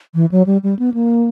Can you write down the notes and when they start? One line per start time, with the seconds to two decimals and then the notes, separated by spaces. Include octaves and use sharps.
0.15 E3
0.32 F#3
0.46 G3
0.63 G3
0.79 B3
0.94 A#3